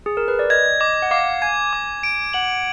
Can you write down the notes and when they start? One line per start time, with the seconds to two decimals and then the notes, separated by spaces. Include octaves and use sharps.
0.06 G#4
0.17 A#4
0.28 B4
0.39 D5
0.50 D#5 G#6
0.80 D#5 D6
1.02 F#5
1.11 F5 D6
1.42 G#5 G#6
1.73 D6
2.03 D7
2.33 F#5 F#7